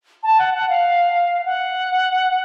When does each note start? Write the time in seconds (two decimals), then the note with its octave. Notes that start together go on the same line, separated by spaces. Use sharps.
0.23 A5
0.39 F#5
0.54 F#5
0.69 F5
1.46 F#5